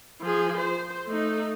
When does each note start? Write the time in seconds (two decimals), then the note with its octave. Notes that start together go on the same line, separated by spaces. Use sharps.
0.21 F3 G#4
0.57 C5
1.07 A3 D#4